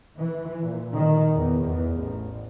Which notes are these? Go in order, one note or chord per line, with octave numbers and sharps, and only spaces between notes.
E3
A#2
D#3
E2
E2
A1